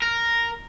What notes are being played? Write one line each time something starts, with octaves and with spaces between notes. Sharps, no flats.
A#4